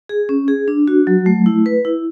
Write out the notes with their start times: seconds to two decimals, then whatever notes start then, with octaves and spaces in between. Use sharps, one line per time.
0.09 G#4
0.29 C#4
0.48 G#4
0.68 D4
0.88 F#4
1.07 F#3
1.26 A3
1.46 E4
1.66 B4
1.85 E4